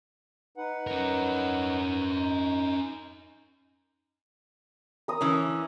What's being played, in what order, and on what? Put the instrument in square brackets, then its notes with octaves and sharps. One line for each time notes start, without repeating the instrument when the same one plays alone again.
[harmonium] D#4 B4 F#5
[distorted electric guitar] C#4 A#4
[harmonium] D#4
[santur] A#4 D#6
[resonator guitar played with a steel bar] E3 C#4